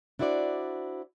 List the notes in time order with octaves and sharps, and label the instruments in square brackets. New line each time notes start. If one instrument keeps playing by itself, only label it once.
[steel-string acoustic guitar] D4 E4 F#4 C5 D5